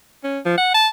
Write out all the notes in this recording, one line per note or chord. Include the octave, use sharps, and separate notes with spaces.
C#4
F3
F#5
A5